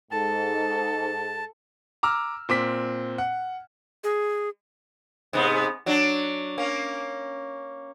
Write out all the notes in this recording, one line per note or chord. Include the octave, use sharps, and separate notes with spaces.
G#2 A4 A5
A#5 D6 E6 F6
A#2 C4 D6 B6
F#5
G#4
G#2 C3 B3
F#3 D4
A#3 C#4